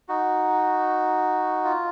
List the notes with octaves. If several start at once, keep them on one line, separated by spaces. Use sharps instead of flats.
D#4 F#4
F4